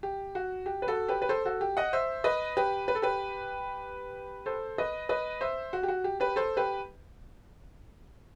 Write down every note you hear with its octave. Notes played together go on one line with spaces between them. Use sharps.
G4
F#4
G4
B4
F#4 A4
G4 B4
B4
A4 C5
F#4 A4
G4
D#5 F#5
C5 E5
B4 D#5
G4 B4
B4
A4
G4 B4
A4 C5
B4 D#5
B4 D#5
C5 E5
F#4
G4
F#4
G4
G4 B4
A4 C5
G4 B4